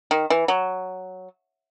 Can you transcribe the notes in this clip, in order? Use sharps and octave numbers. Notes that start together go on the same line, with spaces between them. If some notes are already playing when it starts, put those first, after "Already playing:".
D#3
E3
F#3